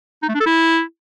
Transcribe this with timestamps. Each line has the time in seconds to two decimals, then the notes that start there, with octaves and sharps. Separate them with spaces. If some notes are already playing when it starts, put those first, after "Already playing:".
0.23 D#4
0.29 A3
0.35 D4
0.40 A4
0.46 E4